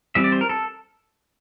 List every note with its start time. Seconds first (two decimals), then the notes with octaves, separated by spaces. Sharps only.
0.15 E3 G3 C4 E5
0.24 D5
0.32 C5
0.41 A#4
0.49 A4